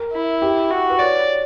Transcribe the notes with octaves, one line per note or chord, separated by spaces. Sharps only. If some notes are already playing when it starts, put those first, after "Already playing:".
Already playing: A#4
E4
G4
F#4
B4
C#5 D5